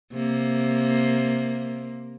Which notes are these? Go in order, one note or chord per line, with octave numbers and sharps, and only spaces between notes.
C3 A#3